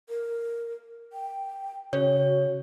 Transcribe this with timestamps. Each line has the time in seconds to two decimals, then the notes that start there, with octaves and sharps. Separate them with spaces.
0.09 A#4
1.13 G5
1.93 C#3 F#4 C#5